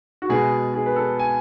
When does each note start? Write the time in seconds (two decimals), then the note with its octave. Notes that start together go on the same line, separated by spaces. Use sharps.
0.22 F#4
0.29 B2 G#3 B3 G#4
0.74 G#4
0.86 B4
0.96 A4
1.19 G#5